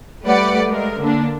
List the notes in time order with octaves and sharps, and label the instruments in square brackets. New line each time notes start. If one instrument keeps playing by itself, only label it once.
[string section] G3 A3 G4 B4 D5 F#5
G#3 A3 A#4
D3 A#3 D4